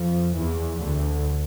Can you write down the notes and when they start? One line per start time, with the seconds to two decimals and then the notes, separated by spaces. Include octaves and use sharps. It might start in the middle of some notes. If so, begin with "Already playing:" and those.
Already playing: F2 F3
0.35 E2 E3
0.80 D2 D3